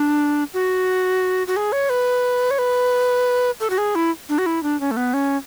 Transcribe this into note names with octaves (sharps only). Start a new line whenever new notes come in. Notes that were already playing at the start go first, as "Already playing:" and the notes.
Already playing: D4
F#4
F#4
G#4
C#5
B4
C#5
B4
A4
F#4
G#4
E4
D4
F#4
E4
D4
C#4
A3
B3
C#4